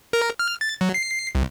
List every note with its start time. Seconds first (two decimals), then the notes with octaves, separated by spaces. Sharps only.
0.13 A#4
0.39 F6
0.61 A6
0.81 F#3
0.94 C7
1.35 C2